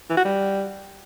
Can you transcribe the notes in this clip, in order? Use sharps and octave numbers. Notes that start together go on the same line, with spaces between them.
E3
F#4
G3